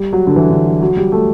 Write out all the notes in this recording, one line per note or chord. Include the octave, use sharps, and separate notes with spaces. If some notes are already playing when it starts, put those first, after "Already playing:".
Already playing: G3
F#3
D3
E3
D3
F#3
F#3
G3
A3